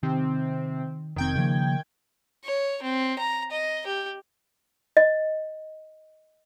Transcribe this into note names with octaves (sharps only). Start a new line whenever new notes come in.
C3 D#3 C4
F1 D#3 C4 G5 G#6
C#3 F3 A#3
C#5
C4
A#5
D#5
G4
D#5